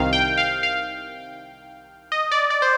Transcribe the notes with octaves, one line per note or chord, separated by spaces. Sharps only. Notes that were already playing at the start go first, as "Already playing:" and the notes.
Already playing: C2 C3 D#3 F5
G5
F5
F5
D#5
D5
D5
C5